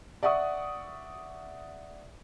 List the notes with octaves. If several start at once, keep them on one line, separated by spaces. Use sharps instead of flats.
D5 E5 F#5 C#6 D#6